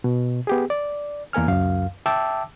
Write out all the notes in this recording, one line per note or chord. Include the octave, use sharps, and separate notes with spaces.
B2
B3 G4 G#4
D5
E2 A#3 A#4 G#5 F6
C#2 F#2 F5
E5 G5 A5 D6 E6